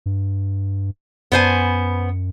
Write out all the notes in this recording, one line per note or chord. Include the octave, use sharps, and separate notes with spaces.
G2
F#2 B3 C5 G#5